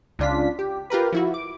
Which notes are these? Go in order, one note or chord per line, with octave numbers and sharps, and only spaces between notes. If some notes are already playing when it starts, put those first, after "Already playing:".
C#2 C#3 D4 F4 B6
G4
F4 G4 A#4 B4
F3 E4 F#4
D6